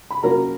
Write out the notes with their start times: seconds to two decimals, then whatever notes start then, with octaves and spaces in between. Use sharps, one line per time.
0.11 B5
0.23 B2 F#3 A#3 C#4 F4 A#4 A#5